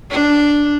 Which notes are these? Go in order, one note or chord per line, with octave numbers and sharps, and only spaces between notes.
D4